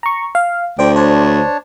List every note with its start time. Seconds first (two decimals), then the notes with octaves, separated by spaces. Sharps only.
0.03 A#5 C#6
0.35 F5
0.79 D2 C5 D5 G5
0.96 D4 C5 C#5 A5